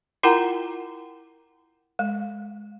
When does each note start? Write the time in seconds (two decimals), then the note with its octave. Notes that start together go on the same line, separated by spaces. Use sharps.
0.23 E4 F4 A#4 F#5 G5 A#5
1.99 G#3